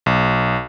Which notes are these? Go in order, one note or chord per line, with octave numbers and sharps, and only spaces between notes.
B1